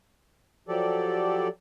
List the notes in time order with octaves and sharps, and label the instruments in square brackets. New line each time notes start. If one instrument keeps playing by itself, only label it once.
[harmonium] F3 F#3 G4 A4 D5